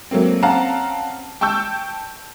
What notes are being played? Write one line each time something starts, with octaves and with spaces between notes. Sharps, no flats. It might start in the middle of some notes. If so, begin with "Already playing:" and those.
F#3 A3 A#3 C4
C4 C#4 F5 F#5 A5 A#5
G5 A5 C#6 E6 G6